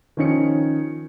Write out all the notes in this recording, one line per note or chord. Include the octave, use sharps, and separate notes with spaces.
D#3 F3 C#4 D#4 C#7